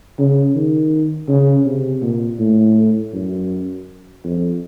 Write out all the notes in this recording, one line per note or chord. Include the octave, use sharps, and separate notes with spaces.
C#3
D#3
C#3
C3
A#2
A2
F#2
F2